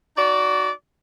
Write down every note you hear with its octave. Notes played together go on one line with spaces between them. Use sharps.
D#4 F#4 D5